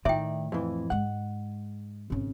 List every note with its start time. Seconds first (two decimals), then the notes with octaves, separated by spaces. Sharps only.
0.05 A2 D#3 D5 E5 G5
0.52 F2 E3
0.90 G#2 G#3 F#5
2.10 G#1 C#3